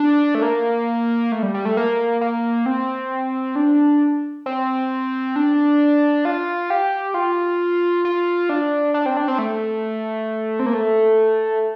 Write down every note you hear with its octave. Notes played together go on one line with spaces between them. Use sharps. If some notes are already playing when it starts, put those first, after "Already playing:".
Already playing: D4
A3
A#3
A3
G3
G3
A3
A#3
A#3
C4
D4
C4
D4
F4
G4
F4
F4
D4
D4
C4
D4
C4
A3
C4
A#3
A3